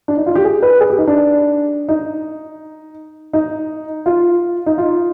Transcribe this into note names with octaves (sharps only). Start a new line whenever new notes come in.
D4
D#4
F4
G4
G#4
B4
G#4
G4
D#4
D4
D#4
D#4
F4
D#4
F4